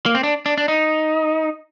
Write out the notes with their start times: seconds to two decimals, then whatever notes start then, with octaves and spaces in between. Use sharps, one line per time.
0.06 A#3
0.15 C4
0.23 D4
0.46 D4
0.58 D4
0.68 D#4